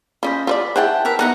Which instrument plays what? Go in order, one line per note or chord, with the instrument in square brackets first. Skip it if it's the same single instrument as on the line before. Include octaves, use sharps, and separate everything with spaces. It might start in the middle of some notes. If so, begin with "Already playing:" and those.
[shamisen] C#4 F4 [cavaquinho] C5 D#5 B5
[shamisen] F4 C5 D5 [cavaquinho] E5
[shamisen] E4 G#4 C5 [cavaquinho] F#5 G5 A5
[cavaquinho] A#4 B4 E5
[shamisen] B3 E4 [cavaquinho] D#4 F#5 A#5